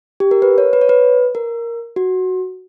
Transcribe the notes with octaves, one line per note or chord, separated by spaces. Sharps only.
G4
A#4
B4
C#5
B4
C#5
B4
A#4
F#4